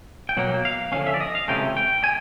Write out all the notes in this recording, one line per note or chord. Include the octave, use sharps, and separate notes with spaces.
G5
B2 F#3 A#3 F#5
F5
D3 F3 G#3 C#4 F5
E5
D5
D#5
F5
C#2 C3 E3 A3 C#4 G5
G5
G#5